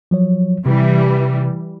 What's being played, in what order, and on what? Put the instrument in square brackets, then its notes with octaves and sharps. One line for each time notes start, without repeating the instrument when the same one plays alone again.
[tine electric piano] F3 F#3 C#5
[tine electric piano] C3 [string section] E3 G3